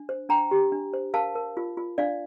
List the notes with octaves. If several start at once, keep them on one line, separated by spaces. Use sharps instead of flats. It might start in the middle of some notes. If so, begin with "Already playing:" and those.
Already playing: D4
C5
D4 G5 A#5
G4
D4
C5
A#4 F5 A5
A#4
F4
F4
D4 D5 F5